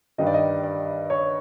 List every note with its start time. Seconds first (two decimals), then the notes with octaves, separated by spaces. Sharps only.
0.18 G2 D#3 G3 D#5
0.27 D5
0.34 D#5
0.64 D5
1.10 C#5